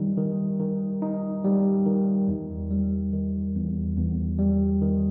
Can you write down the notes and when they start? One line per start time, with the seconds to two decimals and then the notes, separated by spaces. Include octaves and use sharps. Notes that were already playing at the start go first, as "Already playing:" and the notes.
Already playing: D#3 G3 D#4
0.17 D#3
0.60 D#3
1.02 D#4
1.44 G3
1.86 D#3
2.28 E2
2.71 G3
3.13 D#3
3.55 E2
3.97 E2
4.39 G3
4.82 D#3